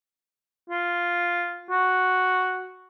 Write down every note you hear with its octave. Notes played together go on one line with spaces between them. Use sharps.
F4
F#4